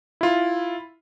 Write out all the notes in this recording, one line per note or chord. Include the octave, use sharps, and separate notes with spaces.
E4 F4